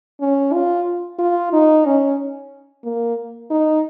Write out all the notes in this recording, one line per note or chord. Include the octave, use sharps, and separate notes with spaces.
C#4
F4
F4
D#4
C#4
A#3
D#4